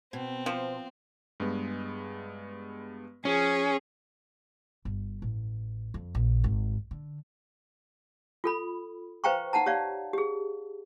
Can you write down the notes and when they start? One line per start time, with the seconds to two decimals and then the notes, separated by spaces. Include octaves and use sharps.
0.13 B2 C4
0.46 F3
1.40 G2 G#3 B3
3.25 F3 C#4 G#4
4.85 G1
5.22 A1
5.94 F2
6.15 A#1
6.44 G#1
6.91 D3
8.44 F4 A4 B5
9.24 B4 C5 F5 G5 A#5 C#6
9.53 D#4 F#5 A5 A#5
9.66 G4 C#5 D5 F5
10.13 G4 G#4